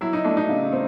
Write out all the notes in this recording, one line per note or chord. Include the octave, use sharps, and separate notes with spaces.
F#3 E4
D#4
A3 D4
D#4
C#3
C4